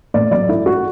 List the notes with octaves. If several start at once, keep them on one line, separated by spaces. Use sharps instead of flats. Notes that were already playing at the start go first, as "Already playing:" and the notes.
A2 D5
F#3 D5
A3 E4
A3 F#4